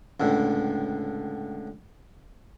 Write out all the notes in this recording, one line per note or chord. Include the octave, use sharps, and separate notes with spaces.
C#2 A2 D3